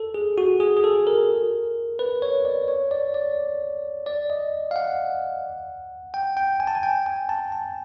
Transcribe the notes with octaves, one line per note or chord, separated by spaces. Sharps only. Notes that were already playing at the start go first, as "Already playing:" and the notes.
Already playing: A4
G#4
F#4
G#4
G#4
A4
A#4
B4
C#5
D5
C#5
D5
D5
D5
D#5
F5
F#5
G5
G5
G#5
A5
G#5
G5
G#5
A5
A5